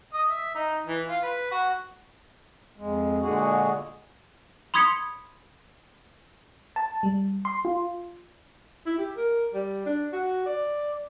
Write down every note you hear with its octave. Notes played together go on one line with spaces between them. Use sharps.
D#5
E5
D#4
E3
F4
B4
F#4
F2 G#3
A#2 D3 G#3 F#4 G#4
B5 C6 D#6 G#6 B6 C#7
A5
G3
C6
F4
E4
G4
A#4
G3
D4
F#4
D5